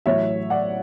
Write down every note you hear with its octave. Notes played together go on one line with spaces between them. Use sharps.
A1 A2 F#3 C#5 E5
D5 F#5